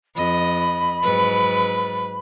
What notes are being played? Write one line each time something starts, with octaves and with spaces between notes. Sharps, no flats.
F2 D#5 B5
G#2 F#3 B4